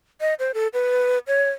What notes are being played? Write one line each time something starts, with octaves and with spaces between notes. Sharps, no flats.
D#5
C5
A4
B4
C#5